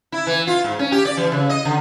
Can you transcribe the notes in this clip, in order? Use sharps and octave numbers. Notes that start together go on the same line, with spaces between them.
E4
E3
F4
G#2
C#4
G4
D5
E3
C#3
D#5
D3